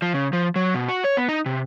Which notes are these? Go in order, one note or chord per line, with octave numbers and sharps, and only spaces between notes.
F3
C#3
F3
F#3
B2
F#4
C#5
B3
D#4
C3